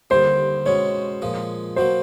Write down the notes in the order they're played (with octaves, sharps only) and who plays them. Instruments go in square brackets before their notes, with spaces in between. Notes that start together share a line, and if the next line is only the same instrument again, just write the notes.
[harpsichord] D#2 D3 G3 [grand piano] C5
[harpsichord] B2 G#3 C#4 [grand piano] C#5
[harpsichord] A#2 F3 G#3
[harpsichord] B2 F#3 A#3 [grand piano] C5